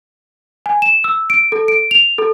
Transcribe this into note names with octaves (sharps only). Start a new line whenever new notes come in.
G#5
E7
E6
D7
A4
D7
F7
A4